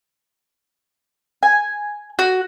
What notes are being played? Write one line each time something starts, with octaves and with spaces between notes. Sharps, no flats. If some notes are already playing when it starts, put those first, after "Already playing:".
G#5
F#4